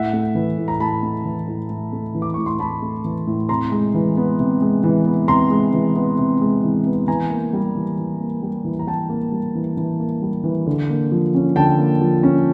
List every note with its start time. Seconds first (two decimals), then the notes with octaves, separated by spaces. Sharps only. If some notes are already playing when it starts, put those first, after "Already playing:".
Already playing: A2 E5 F#5
0.13 A3
0.35 E3
0.58 A2
0.68 A#5
0.80 A2 A5 B5
1.03 A3
1.25 E3
1.48 A2
1.70 A2
1.93 A3
2.14 E3
2.22 D6
2.34 A2 C#6
2.46 C6
2.59 A2 A5 B5
2.82 A3
3.05 E3
3.27 A2
3.49 C3 A#5 C6
3.72 G#3
3.94 E3
4.17 B3
4.39 C3
4.62 G#3
4.84 E3
5.06 B3
5.28 C3 A#5 C6
5.51 G#3
5.73 E3
5.95 B3
6.18 C3
6.41 G#3
6.63 E3
6.86 B3
7.08 E3 G#5 A#5
7.30 A#3
7.53 G3
7.75 E3
7.98 E3
8.20 A#3
8.42 G3
8.65 E3
8.79 A#5
8.87 E3 G5 A5
9.09 A#3
9.32 G3
9.55 E3
9.77 E3
10.00 A#3
10.22 G3
10.44 E3
10.67 D3
10.89 A#3
11.12 F3
11.35 C#4
11.56 D3 G5 A5
11.79 A#3
12.01 F3
12.23 C#4